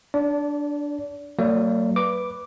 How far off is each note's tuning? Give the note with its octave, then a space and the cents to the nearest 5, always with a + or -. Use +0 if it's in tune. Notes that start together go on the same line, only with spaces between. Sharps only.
D4 -5 D5 -35
F#3 +15 A#3 -45 D5 +0
B4 +0 D6 +0